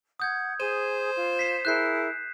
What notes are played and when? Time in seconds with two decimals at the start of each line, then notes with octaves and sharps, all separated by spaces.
0.20 F#5 D#6 G6 G#6
0.60 G#4 C5 D#7
1.16 F4
1.39 B6 C7 E7
1.65 E4 G#4 A#4 F#6 G6 C7